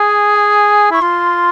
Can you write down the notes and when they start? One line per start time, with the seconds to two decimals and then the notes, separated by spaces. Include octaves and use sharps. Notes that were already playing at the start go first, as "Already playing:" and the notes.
Already playing: G#4 G#5
0.34 G#5
0.91 E4 C#6
1.02 F4 C6